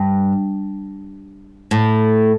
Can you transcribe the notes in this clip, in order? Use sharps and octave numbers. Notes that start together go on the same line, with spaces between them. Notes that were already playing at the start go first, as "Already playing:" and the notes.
Already playing: G2
A2